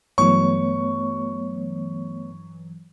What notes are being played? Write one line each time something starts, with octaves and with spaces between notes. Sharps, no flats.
G2 E3 F#3 A3 B3 C#5 C#6